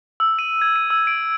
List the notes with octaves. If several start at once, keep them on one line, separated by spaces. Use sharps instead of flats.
E6
D#7
G#6
D#7
E6
D7